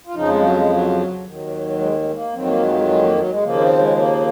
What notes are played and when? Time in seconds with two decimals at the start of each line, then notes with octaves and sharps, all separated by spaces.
0.07 F4
0.15 F2 C#3 F3 D#4
0.29 G#3
0.42 F#3
0.57 G#3
0.69 F#3
1.24 D#2 D#3 F#3
1.79 G#3
1.93 F#3
1.98 G#3
2.10 G#3
2.15 A#3
2.33 F2 D#3 F#3 C4
2.47 A#3
2.60 G#3
2.69 A#3
2.74 G#3
2.88 G#3
3.02 A#3
3.16 F#3
3.30 G#3
3.42 D#2 C#3 F3 A#3
3.61 C4
3.79 G#3
3.97 A#3